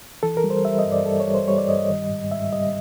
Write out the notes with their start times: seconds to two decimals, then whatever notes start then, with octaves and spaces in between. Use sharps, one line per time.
0.23 E3 A4
0.37 A#4
0.44 G3
0.50 C5
0.65 G3 E5
0.79 D#5
0.85 G2
0.92 D5
1.06 G3 A4
1.20 C#5
1.28 G3
1.35 C5
1.48 G3 C#5
1.58 D5
1.68 G2 D#5
1.79 D#5
1.90 D#3
2.10 G#2
2.31 G#2 E5
2.52 G3 D#5